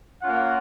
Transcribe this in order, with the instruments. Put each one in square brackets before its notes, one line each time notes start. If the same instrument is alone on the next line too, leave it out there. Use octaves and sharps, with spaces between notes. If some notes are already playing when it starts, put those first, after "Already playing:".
[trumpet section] A#3 C#4 F4 F#5